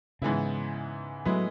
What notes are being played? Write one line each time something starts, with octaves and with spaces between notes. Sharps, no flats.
G#2 C#3 E3 B3 E4
A2 F#3 G#3 B3 E4